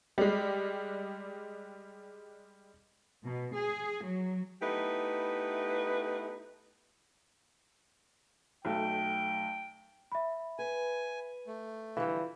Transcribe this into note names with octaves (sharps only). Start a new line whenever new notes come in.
G3 G#3
B2
G#4
F#3
A3 B3 D#4 E4 G4 B4
B1 F#3 A3 G5
E5 B5
B4 G#5
A3
D3 E3 F3 G3 F5